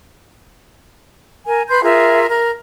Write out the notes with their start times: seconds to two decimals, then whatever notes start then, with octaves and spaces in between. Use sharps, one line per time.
1.46 A#4 G#5
1.68 B4 C6 G6
1.83 F4 G#4 A#4 E5
2.28 A#4